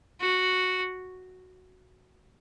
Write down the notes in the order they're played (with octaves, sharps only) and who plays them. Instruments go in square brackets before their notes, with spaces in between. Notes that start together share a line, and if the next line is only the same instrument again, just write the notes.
[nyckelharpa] F#4